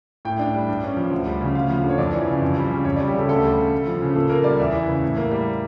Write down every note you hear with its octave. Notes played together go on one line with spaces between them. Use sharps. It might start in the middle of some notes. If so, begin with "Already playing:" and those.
A2 G5
D4
G3
G2
C#4
F3
D2
G3
C#3
D2 F5
F3
D3
C#5
F2 D5
E3
C#3
F2
G3
C#3
F2 C#5
D5
G3
G4
C#3 A4
D2 A4
G3
C#3
D2
F3
C#3
A#2 A4
A#3 A#4
G3 D5
E2 E5
E3
C#3
A2
A#3
G3